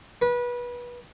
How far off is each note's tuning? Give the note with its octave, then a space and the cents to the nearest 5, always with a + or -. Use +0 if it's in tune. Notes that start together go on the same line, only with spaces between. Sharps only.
B4 -25